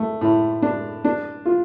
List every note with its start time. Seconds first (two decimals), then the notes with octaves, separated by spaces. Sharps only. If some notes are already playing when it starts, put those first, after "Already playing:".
Already playing: A3
0.21 A2
0.62 D4
1.05 D4
1.45 F4